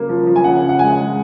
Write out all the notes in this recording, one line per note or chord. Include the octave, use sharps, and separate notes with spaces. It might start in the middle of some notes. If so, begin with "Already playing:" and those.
Already playing: C#3 F#3 A#3
F3
F3
G#5
C#3 F#5
C#3
F#5
G#3 G#5
G#3